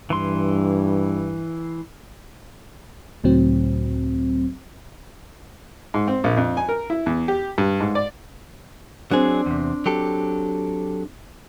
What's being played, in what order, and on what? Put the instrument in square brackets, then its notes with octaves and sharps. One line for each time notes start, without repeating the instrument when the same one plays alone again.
[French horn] G2 [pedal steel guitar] E3 C6
[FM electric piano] C#2 A2 F#3 C4
[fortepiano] G#2
C4
A#1
F2
G#5
A#4
E4
E2
G4
G2
G#2
D5
[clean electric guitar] F#3 G#4 [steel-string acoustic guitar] C4 D4
[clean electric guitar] E2 C3
F#3 G4 A4